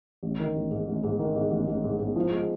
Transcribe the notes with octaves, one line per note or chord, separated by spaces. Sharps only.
A1
D#3
A1
G#2
A1
G#2
D#3
G#2
A1
A1
G#2
G#2
F3
G#3